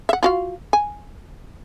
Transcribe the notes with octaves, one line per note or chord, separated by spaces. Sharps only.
E5 F#5
F4 F#4 F5
G#5